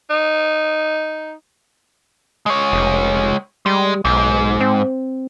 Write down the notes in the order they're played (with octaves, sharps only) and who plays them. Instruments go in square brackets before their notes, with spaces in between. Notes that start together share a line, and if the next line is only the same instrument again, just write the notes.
[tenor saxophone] D#4
[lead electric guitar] G#3 C#5
[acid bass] F1
[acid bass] G3 [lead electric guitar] G#3
[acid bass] B1 [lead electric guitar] G#2
[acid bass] C4